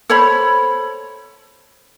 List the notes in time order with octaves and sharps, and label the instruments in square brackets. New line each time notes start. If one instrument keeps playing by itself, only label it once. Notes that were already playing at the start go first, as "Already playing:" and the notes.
[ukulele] A4 C5 C#5 B5